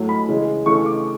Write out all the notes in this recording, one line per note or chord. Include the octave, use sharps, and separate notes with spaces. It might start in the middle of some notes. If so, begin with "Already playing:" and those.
Already playing: A2 F#3 A3
B5
C#3 E3 G#3
C#3 E3 A3 C#6
D6